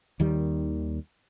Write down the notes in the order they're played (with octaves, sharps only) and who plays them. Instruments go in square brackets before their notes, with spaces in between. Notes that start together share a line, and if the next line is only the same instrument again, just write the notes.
[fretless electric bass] D#2 D#3 G3